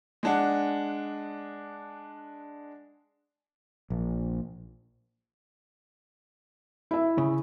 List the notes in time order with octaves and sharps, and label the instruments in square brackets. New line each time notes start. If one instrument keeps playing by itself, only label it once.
[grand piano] G#3 D4 F#5
[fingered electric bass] A#1
[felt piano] E4 E5
[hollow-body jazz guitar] C#3